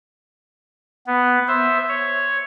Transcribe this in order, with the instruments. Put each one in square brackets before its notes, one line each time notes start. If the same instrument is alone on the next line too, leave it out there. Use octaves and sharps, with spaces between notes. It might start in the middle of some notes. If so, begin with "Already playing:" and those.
[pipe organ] B3
C5 E5
C#5